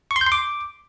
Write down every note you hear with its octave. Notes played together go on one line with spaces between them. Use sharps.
C#6
C6
G6
C6
D6